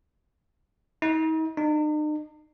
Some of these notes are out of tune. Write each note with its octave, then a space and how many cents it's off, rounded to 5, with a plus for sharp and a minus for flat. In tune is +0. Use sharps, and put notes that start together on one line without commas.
D#4 +40
D#4 -45